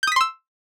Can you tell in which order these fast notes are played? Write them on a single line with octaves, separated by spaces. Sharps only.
G6 D#6 B6 C6 E6